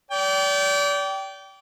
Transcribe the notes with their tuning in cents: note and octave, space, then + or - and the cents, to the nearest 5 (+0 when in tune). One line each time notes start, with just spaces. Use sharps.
D5 -35 G5 -20